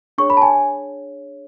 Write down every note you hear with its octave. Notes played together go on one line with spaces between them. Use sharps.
D4 G#4 C#5 C#6
B5
A5
G#5